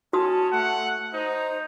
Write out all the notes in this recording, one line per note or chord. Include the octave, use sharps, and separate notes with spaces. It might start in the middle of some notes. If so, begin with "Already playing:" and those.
C#4 F#4 A5 D#6
A3 F#5
D#4 C5